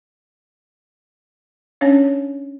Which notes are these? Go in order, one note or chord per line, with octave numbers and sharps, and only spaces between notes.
C#4 D4 C#5 F5